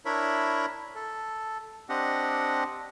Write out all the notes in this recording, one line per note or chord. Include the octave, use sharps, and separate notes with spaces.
D4 E4 A#4 C#5 E5 B5
A4
C4 D4 G4 D#5 F#5